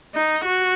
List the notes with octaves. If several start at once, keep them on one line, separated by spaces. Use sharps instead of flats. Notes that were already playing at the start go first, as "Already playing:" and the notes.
D#4
F#4